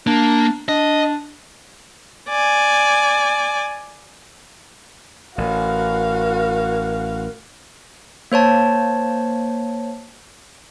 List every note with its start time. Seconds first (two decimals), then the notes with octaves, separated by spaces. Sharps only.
0.07 A#3 D4
0.69 D4 D#5
2.29 D5 G#5
5.38 A1 F#4 A#4 F5
8.32 A#3 C5 C#5 A5